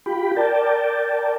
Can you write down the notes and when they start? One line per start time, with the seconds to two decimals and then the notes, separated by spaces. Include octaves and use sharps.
0.06 F4 G4 G5 B5
0.36 A#4 D5 G5 A5